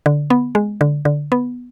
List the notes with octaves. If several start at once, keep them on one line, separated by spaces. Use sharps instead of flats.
D3
B3
G#3
D3
D3
B3